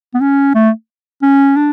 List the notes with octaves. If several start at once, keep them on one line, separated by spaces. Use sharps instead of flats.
B3
C#4
A3
C#4
D4